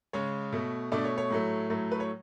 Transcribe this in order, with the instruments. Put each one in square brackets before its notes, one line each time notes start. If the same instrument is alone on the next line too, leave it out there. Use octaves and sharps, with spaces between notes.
[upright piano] C#3 G#3 C#5
B2 A3
B2 A3 D4 D5
C#5
C#5
A2 F#3 A3
A2 F#3 A3
B4
C#5